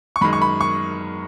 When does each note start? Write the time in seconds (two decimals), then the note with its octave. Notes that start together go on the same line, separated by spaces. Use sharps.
0.16 C#6
0.21 F#2 D#3 G#3 B5
0.33 C#6
0.42 B5
0.61 C#6